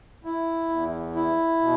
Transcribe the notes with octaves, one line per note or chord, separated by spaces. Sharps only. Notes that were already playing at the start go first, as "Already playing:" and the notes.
E4
E2
E4
B2